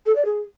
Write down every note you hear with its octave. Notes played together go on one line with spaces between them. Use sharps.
A4
D5
G#4